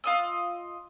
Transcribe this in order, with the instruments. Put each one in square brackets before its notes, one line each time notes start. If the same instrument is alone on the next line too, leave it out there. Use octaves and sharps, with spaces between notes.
[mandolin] F4 D#5 E6